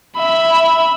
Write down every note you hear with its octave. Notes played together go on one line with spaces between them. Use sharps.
E5 B5